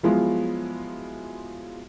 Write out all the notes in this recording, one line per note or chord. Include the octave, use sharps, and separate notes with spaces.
F3 F#3 G#3 B3 E4 F4